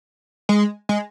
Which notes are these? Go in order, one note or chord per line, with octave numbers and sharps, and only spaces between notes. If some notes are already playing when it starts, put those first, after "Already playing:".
G#3
G#3